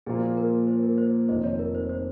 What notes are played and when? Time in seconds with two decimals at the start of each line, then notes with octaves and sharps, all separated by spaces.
0.06 A#2 F3 A#3 F4 G#4
0.37 A#4
0.67 C5
0.83 A#4
0.98 C5
1.28 F1 F2 D#3 C5 D#5
1.44 C#5
1.59 A#4
1.75 C5
1.89 C5